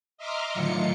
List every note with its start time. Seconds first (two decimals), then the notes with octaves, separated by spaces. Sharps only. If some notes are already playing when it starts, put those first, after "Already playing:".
0.18 D#5 E5 A#5 C6 D6 F6
0.54 A2 D3 D#3 F#3 F4 C#7